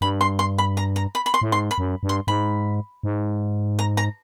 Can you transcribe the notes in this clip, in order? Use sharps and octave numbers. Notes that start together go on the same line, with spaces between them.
G2 B5
C6
C6
B5
A#5
A#5
B5
B5
C6
A2
G#2 C6
B5
F#2
G2
C6
G#2 B5
G#2
A#5
A#5